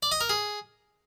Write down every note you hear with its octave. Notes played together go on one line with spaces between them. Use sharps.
D5
D#5
A#4
G#4